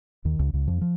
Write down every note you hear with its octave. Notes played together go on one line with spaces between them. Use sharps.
D#2 D#3
C#2 C#3
C#2 C#3
F2 F3
F3